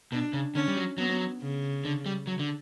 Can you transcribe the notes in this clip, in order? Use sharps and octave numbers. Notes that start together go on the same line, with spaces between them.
B2 D4
C#3
D3 C#4
G3
F#3
F#3 B3
C#3
D3
G3
F#3
D3